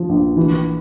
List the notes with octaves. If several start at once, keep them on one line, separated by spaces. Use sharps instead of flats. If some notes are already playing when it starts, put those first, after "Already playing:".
Already playing: F3
A#1
E3